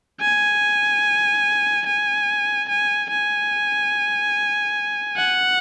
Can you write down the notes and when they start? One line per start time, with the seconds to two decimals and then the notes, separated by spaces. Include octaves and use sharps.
0.21 G#5
1.86 G#5
2.69 G#5
3.10 G#5
5.17 F#5